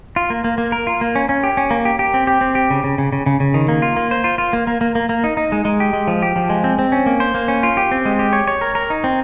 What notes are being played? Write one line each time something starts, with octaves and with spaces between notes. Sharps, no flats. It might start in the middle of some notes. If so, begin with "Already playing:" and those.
F4
A#3
A#3
A#3
A#4
F4
A#3
C#4
C#4
G4
C#4
A#3
G4
G4
C4
G4
C4
G4
C#3
C#3
C#3
C#3
C#3
C#3
D#3
A#3
F4
A#3
C5
F4
F4
A#3
A#3
A#3
A#3
A#3
D#4
D#4
G#3
G#3
G4
G#3
F3
G4
F3
G#3
C4
C4
C#4
A#3
C5
A#3
C#4
F4
G4
C4
G#3
G4
C#5
C#5
A#4
A#4
D#4
C4